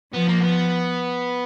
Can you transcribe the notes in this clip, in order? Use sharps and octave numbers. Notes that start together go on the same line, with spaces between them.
F3 B3
A#3
B3